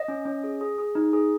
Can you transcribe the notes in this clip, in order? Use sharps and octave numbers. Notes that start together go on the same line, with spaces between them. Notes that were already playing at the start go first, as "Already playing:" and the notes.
Already playing: D#5
C#4
C#4
G#4
G#4
G#4
D#4
G#4